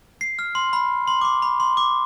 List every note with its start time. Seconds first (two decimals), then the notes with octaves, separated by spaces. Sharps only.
0.21 C7
0.39 F6
0.55 C6
0.73 B5
1.07 C6
1.21 D6
1.25 C6
1.42 B5
1.60 C6
1.77 D6